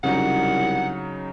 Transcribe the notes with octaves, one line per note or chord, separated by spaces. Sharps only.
C2 C#3 F#3 D#4 F#5